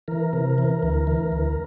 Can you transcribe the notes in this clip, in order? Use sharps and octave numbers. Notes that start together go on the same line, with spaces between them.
E3 A#4
C3
E3
D2
E3
D2